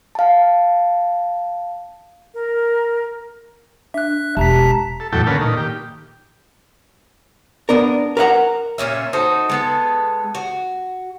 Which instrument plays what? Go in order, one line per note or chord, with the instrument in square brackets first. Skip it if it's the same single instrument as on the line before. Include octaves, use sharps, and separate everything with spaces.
[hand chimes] F5 A5
[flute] A#4
[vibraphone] D4 [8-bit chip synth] E5 F#6
[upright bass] E1 [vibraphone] G4 [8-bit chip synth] A5 A#5 B6
[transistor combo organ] A4
E2 A2 F#3 A4 G5
D3 A#3 C#4 A4 B4
A#2 D#3
G4
[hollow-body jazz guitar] B3 D4 A#4
A#4 B4 F5 F#5 A#5
[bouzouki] A#2 C#3 C#4 E5
D#4 F#4 A4 C5
G#3 B3 A4
F#4